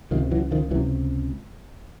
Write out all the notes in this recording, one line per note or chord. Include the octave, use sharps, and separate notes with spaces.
C#2 C3 D#3 F3
E3 F#3
D#3 F3
C#2 C3 E3 F#3